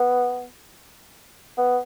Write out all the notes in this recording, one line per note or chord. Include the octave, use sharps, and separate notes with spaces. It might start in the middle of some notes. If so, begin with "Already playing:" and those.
Already playing: B3
B3